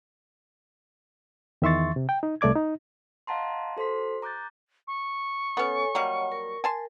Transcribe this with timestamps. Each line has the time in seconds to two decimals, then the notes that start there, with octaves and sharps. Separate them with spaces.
1.62 E2 D#3 E5 C6 C#6 A6
1.96 C3
2.09 G5
2.23 D#4
2.41 C2 A3 D5 D6 G#6
2.56 D#4
3.27 D#5 F5 F#5 A5 A#5 C6
3.77 F#4 A4 C5 C6 B6
4.22 A#5 D6 F#6 G6 A6
4.87 C#6
5.57 B3 C#4 A4 C#5 G#5
5.95 F#3 G3 A#3 C#5 D#5 F#5
6.32 A#4
6.64 G#5 A5 C6